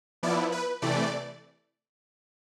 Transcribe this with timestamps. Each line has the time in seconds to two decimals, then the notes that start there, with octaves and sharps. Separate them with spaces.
0.23 F3 B3 E4 D5
0.52 B4
0.82 C3 E3 A3 D5